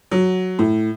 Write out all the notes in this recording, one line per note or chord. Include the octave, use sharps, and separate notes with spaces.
F#3
A2